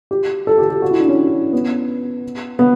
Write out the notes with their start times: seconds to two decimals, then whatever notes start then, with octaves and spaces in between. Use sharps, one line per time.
0.11 G4
0.47 A4
0.58 G4
0.70 G4
0.82 F#4
0.91 E4
1.00 D4
1.08 C#4
1.53 B3
2.59 B3